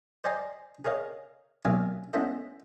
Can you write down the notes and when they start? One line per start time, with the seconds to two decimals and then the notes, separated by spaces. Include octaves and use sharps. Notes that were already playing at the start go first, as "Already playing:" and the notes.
0.24 C5 D5 D#5 G#5 A#5 C6
0.85 G#4 A#4 C#5 D#5 F5
1.65 B1 F#3 A#3 E5 F5 G#5
2.13 G#3 B3 C#4 E4 A4 D#5